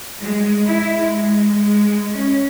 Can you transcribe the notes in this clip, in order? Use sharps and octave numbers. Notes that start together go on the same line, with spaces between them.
G#3
E4
G#3
G#3
C#4